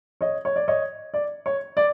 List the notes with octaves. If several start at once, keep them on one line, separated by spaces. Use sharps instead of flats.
C#5 D#5
C#5
D5
C#5 D#5
D5
C#5
D5